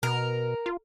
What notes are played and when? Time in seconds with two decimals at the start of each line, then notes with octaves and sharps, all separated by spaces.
0.03 B2 A#4
0.66 F4